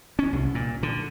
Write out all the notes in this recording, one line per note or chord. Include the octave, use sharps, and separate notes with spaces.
C#4
C2
A#2
D3